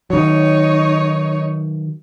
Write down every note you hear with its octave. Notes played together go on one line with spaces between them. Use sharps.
D#3 F#3 D#4 C#5